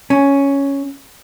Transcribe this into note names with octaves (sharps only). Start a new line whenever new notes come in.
C#4